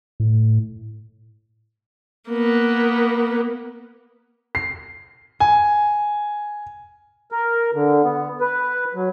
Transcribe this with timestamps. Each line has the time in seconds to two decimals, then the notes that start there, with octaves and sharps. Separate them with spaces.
0.20 A2
2.29 A#3 B3
4.55 C7
5.40 G#5
7.32 A#4
7.74 D3
8.04 B3
8.41 B4
8.95 F#3